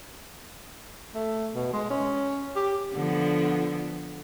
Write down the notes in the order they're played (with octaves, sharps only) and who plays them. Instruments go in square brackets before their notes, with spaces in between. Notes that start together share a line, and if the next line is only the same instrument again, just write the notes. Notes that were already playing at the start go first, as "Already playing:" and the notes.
[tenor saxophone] A3
B2
G#3
C#4
G4
[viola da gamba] D3 F3 B3